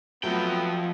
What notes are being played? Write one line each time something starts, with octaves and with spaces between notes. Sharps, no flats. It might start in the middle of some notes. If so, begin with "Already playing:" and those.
F2 F#3 A3 B3 F4 G5